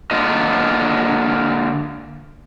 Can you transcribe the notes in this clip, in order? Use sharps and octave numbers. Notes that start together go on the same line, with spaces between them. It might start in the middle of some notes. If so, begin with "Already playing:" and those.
D3 A#3 F4 D#5